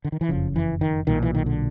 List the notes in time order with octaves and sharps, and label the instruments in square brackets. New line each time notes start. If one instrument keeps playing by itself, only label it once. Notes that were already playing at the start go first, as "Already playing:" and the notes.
[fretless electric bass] D3
D#3
E3
F#1 F2 C#3 F3
E3
D#3
B1 A#2 D#3
E3
D#3
D3